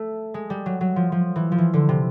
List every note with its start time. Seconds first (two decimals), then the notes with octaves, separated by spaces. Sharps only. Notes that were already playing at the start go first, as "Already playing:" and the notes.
Already playing: A3
0.34 G#3
0.50 G3
0.66 F#3
0.81 F#3
0.96 F3
1.12 F3
1.36 E3
1.52 F3
1.58 E3
1.74 D3
1.89 C3